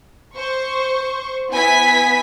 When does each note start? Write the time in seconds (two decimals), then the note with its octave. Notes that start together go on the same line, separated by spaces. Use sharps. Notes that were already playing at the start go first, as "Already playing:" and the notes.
0.36 C5 C#6
1.51 B3 E4 G#5 B6